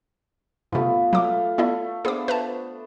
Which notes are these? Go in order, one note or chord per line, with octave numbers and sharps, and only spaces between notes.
G2 C3 A3 B3 F4
F#3 A3 F5 C6 D6
A3 B3 E4 D5
B3 D4 G#4 C5 D6
B4 E5 A5